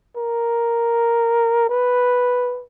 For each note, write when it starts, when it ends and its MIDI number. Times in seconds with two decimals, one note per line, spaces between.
0.16 1.68 70
1.69 2.63 71